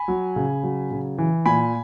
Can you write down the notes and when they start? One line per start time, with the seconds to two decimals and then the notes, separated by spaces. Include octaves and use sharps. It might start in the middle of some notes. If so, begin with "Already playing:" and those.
Already playing: G#5 B5
0.08 F#3
0.36 C#3
0.63 F#3
0.91 C#3
1.18 E3
1.46 A#2 G#5 B5